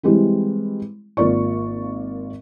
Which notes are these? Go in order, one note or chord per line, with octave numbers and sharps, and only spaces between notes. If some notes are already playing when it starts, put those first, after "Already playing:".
E3 G3 G#3 C4 E4
G#1 A#3 F4 D5 C#6